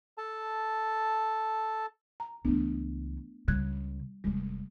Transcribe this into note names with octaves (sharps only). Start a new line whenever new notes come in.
A4 A5
A#5
C#2 E3 A3 B3 D4
C#2 C#3 G3 F#6 G#6
F1 D#2 G3 G#3